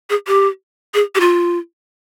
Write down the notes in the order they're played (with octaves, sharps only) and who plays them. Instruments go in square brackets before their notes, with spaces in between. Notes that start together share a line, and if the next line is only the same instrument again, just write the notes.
[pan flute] G#4
G4
G#4
G4
F4